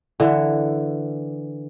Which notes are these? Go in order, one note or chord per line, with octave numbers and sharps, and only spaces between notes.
D3 E3